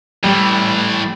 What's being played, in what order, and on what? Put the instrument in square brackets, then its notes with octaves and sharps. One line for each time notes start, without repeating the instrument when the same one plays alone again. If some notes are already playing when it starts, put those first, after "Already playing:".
[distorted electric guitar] A2 E3 [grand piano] G3